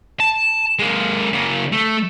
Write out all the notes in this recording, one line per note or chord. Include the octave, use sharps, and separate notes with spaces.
A5
G#3 A#3
C#3 A#3
A3